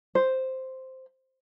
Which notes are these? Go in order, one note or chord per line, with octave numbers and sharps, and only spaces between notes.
C5